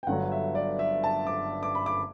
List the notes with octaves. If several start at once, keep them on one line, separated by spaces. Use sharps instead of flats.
G5
G1 G2 D3 F#3 F#5
E5
D5
E5
A5
D6
D6
B5
D6